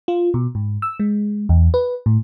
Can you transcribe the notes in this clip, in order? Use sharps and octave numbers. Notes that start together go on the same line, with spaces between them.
F4
B2
G#2
E6
G#3
E2
B4
A2